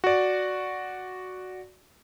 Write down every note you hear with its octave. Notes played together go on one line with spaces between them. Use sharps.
F#4 D5